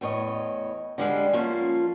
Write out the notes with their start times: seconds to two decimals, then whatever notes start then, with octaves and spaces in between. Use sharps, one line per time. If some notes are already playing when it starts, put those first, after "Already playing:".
0.01 E2 A2 C#5 D#5
0.98 D3 G3 G#3
1.33 F3 A#3 C#4 F4